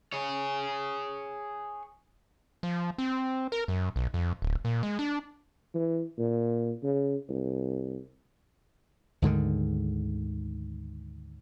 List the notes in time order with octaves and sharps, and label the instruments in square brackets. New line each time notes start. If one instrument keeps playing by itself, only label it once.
[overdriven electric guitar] G#4 C#5
[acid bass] F3
C4
A#4
F#2
B1
F2
D1
A#2
G#3
D4
[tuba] E3
A#2
C#3
C2
[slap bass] D2 G#2 D3 D#3